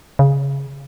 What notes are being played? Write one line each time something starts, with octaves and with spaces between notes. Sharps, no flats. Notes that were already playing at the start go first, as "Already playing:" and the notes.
C#3